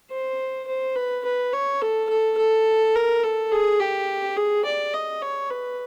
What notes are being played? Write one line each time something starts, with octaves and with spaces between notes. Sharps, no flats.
C5
C5
B4
B4
C#5
A4
A4
A4
A#4
A4
G#4
G4
G#4
D5
D#5
C#5
B4